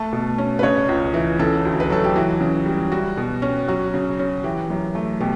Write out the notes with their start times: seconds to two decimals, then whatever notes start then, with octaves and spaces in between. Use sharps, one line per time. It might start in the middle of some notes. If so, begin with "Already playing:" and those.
Already playing: A3 A5
0.13 B2
0.38 C#4
0.59 B4
0.63 C#3 C#5
0.89 C#2
1.14 E3
1.39 C#3 A4
1.65 D2
1.80 B4
1.90 F#3 A4
2.04 G4
2.16 E3 F#4
2.41 C#3
2.66 G3
2.92 G3 F#4
3.17 B2
3.42 C#4
3.68 F#3 F#4
3.94 C#3
4.19 C#4
4.44 E3 G4
4.70 F#2
4.95 A3
5.20 B2 G4